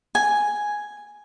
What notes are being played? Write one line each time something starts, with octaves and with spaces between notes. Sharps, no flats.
G#5